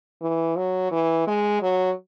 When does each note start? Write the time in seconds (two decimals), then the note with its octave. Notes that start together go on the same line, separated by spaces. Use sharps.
0.22 E3
0.57 F#3
0.91 E3
1.27 G#3
1.62 F#3